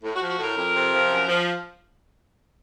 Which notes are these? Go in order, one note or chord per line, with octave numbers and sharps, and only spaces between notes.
A2
F#4
F3
F#4
A2 A#4
F2
C3
F3
F#2
F3